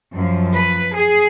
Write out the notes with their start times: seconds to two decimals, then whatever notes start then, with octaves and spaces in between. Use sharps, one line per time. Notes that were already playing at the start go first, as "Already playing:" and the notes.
0.13 F#2 F3
0.55 B4
0.97 G#4